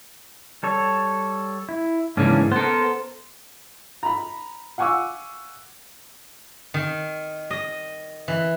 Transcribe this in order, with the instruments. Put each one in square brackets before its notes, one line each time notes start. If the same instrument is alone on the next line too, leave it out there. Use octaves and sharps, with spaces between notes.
[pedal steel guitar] G3 A4 C#5
E4
[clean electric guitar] G#2 C#3 E3 [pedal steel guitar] A#3 C#4 D4
[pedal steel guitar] B3 A#4 [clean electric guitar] A4 C5
[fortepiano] A#5 B5
F5 F#5 G#5 C#6 D6 E6
[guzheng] D#3
D#5
E3